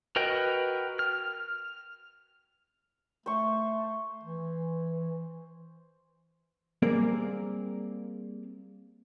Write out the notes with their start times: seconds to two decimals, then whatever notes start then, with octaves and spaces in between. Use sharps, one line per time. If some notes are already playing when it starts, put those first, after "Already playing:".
0.16 F#4 A#4 B4 D#5 G5
0.99 F6
3.26 A3 C5 C#6
4.24 E3
6.82 G3 A#3 C4 G#4 A#4 D5